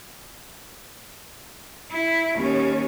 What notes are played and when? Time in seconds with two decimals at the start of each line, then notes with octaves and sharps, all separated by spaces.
1.92 E4
2.37 D#2 C#4